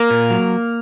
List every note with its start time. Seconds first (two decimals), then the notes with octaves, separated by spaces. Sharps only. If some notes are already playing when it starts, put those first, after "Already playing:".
Already playing: A#3 A#4
0.10 A#2
0.30 F#3